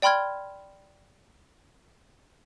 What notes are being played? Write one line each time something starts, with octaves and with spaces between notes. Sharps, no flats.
D5 G5 B5 C6 F6 G#6